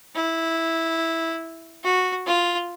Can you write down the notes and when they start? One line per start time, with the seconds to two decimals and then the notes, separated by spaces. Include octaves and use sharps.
0.16 E4
1.84 F#4
2.27 F4